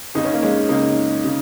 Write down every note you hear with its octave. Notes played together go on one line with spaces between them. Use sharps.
C#2 C#3 D#4
C#4
A#3
G#3 C#4
C#2 C#3 A#3 D#4
C#3